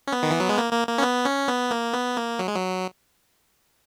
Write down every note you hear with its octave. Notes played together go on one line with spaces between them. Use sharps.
C#4
B3
D#3
E3
F#3
G#3
A#3
A#3
A#3
C#4
B3
C#4
B3
A#3
B3
A#3
F#3
G#3
F#3